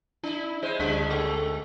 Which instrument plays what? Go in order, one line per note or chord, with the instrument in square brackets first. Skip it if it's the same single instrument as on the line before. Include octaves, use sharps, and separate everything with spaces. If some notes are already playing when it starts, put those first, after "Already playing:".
[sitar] D4 [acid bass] E4
[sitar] G#3 C5 D#5
[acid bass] D2 [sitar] C#3 G3 D4
[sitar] G#3 [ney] A4